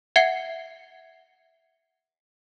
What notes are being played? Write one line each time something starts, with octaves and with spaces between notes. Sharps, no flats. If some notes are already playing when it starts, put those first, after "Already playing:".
E5 F#5 G#6 C7 C#7 G7